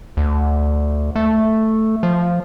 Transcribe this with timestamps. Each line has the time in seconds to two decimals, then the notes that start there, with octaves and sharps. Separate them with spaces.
0.17 D2
1.16 A3
2.03 F3